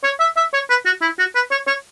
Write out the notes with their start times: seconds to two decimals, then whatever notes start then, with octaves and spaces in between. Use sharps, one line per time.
0.04 C#5
0.20 E5
0.37 E5
0.53 C#5
0.70 B4
0.85 F#4
1.01 E4
1.19 F#4
1.35 B4
1.51 C#5
1.67 C#5